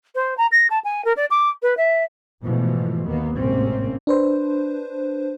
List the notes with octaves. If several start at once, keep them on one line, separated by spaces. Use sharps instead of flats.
C5
A#5
A#6
A5
G#5
A#4
D5
D6
B4
E5
G#2 B2 E3 F3 A3
D#2 D#3 A#3 B3
A1 G#2 C3 A#3 C4 C#4
D4 B4 C5